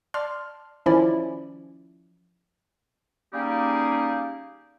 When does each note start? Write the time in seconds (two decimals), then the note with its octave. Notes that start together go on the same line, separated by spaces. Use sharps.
0.14 D5 A5 C6 F6
0.86 D#3 F3 C#4 E4 D5
3.34 G3 A#3 C#4 D#4 G4 G#4